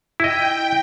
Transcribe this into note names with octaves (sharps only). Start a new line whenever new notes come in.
E4 D#5 G5